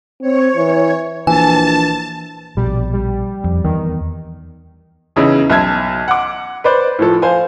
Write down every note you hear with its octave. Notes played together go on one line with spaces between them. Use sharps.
C4 C#5
E3
A#1 E3 G#5 A5
A#1 B2 G3
G3
F2
E2 D#3
E2 C#3 C#4 D#4 E4
B1 E5 A5 G#6
F#5 D6
B4 C5 D5
A2 F3 A4
C5 F5 G#5